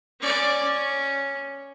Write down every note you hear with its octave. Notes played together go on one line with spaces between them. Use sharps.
C#4 D5
C#4